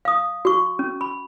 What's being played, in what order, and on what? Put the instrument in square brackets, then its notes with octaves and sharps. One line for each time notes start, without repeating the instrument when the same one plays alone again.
[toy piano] F5 D#6
F#4 C#6
C#4
B5